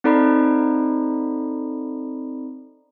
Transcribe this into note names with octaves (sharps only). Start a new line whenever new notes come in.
C4 D#4 A4 D5 A#5 B5